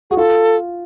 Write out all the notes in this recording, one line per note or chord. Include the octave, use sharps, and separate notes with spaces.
F#4 G#4
F4 A4